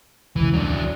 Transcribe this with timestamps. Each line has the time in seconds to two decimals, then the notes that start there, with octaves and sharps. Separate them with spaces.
0.36 E1 C#2 E3
0.54 F#3 D4